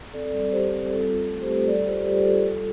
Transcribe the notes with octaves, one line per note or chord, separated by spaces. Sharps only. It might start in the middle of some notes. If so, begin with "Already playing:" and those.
C4 A4 D5
G3
G3 G4 C5
C4
F4 A4
F4
A3
G4 C5
A3
G3 A4 D5
F4 G4 C5
A4
G3 G4
F4 A4
G3 A4